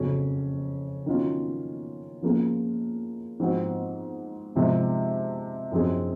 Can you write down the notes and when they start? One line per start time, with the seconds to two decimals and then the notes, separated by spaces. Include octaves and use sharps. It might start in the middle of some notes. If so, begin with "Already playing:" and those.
Already playing: F2 C#3 F#3 C#4
1.06 D#3 F#3 C#4 F4
2.22 F3 A#3 C#4 F4 G#4
3.40 G#2 F3 C4 F#4
4.55 C3 F3 G#3 D#4
5.71 F#2 F3 C4 D#4 G#4